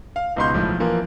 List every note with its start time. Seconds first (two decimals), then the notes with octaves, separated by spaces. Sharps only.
0.16 F5
0.36 C#2 B2 D#4 B5 C6 G6
0.54 B1 A2 F3
0.80 E3 F3 A#3